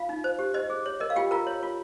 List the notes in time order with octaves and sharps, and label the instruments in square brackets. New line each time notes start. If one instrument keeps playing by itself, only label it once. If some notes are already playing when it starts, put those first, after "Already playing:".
Already playing: [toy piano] F4 F5
D#4
C5
G4
C5 D#5
G#4
C#5
A#4 D#5
F5
F4 G4 G5
F4 A#4 A#5
C#5
F4